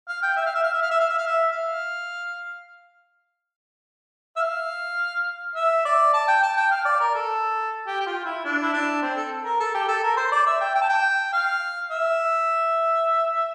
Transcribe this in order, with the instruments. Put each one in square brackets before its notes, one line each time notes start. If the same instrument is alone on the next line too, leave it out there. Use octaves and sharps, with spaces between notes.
[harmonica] F5
G5
E5
F5
E5
F5
E5
F5
E5
F5
E5
F5
E5
F5
E5
F5
E5
D5
A5
G5
A5
G5
F5
D5
A#4
A4
G4
G4
F4
E4
D4
E4
D4
C4
A4
A#4
A4
G4
A4
A#4
C5
D5
E5
G5
G5
A5
G5
F5
E5